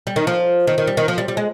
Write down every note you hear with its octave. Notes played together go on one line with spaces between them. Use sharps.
G3
D#3
F3
D#3
D#3
G3
D#3
F3
G3
G3
G#3